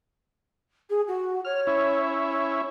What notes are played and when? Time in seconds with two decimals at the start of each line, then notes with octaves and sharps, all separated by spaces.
0.89 G#4
1.08 F#4
1.45 C#5 F6
1.67 C#4 E4
2.31 C#5